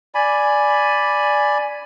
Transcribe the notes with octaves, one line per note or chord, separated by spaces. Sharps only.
D5 G#5 B5